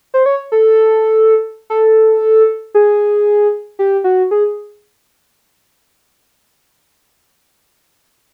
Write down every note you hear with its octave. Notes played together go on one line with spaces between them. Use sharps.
C5
C#5
A4
A4
G#4
G4
F#4
G#4